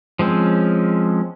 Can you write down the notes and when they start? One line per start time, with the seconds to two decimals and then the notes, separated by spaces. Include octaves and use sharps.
0.19 F3 G#3 C4 C#4